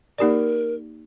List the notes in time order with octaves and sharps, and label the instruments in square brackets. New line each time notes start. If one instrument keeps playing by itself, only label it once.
[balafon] A#3 D#4 G4 D5 [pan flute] A#4